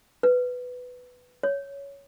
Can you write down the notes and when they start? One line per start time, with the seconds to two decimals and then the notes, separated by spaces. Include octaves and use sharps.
0.23 B4
1.43 C#5